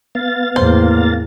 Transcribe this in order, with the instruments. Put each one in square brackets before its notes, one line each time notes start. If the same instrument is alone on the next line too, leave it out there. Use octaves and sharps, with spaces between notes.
[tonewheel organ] B3 F5 A6
[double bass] E2 A2 [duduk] A#3 [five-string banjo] C5